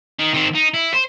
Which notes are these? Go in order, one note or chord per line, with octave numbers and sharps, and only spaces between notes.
D#3
D#3 C4
D#4
E4
C5